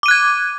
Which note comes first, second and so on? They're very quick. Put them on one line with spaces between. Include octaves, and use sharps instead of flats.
D6 D#7 F#6 G#6